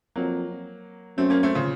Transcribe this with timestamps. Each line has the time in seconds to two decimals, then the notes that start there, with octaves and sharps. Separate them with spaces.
0.16 F2 F#3 A#3
1.18 F#2 A3 C4
1.30 A#3 C#4
1.43 A3 C4
1.55 A#2 C#3